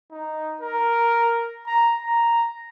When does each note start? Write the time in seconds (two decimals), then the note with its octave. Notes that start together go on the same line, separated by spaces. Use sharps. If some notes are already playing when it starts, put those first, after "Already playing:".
0.12 D#4
0.61 A#4
1.67 A#5
2.02 A#5